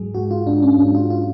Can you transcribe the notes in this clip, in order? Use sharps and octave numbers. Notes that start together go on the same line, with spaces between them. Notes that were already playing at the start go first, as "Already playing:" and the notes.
Already playing: G#2 F#3 G#4
G#2 F#4
F4
G#2 D4
C#4
G#2 D4
F4
F4